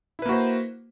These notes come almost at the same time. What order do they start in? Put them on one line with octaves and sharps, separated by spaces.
E4 B4 A#3 F#4 C5